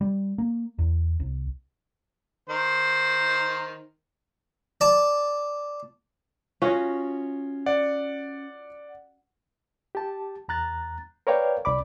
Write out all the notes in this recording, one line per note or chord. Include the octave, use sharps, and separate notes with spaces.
G3
A#3
E2
C2
D#3 C5
D5 A5
C#4 F4 F#4 C#5 D#5
D5 F#5
G4 A5
E2 A#5 F#6 A6
A#4 B4 C#5 D5 F5 G5
C2 D5 B5 D6